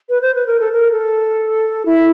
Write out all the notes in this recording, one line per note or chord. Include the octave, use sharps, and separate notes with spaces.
B4
C5
B4
A#4
A4
A#4
A4
E4